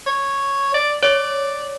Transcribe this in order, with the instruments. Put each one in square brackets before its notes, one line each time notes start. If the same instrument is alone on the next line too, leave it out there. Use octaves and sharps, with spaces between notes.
[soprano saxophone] C#5
D5
[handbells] C#5 [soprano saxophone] D5